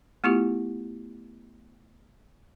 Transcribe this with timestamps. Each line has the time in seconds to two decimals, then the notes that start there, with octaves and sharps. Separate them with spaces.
0.24 A3 B3 E4 F4 G4